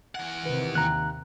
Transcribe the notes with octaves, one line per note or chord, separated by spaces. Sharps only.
E3 F#5
C3 D#3 B4
D#2 C3 A#5 F#6